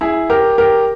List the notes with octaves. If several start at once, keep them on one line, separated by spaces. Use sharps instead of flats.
E4 G#4
G4 A#4
G4 A#4